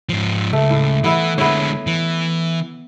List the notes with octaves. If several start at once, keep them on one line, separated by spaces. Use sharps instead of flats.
G#2 F3
C#2 A3
A2
E3 B3 E4 F#5
D3 G#3 B3 E4 C#5
E3